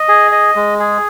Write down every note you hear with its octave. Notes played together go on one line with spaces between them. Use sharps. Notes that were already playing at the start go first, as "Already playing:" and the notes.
Already playing: D#5
G#4
D#5
G#3
G#4